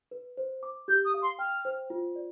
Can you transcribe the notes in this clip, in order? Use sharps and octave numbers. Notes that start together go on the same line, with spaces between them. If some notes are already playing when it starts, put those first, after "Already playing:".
B4
C5
D6
G4 G6
D#6
F5
C6
G5 F6
C5
F4
D5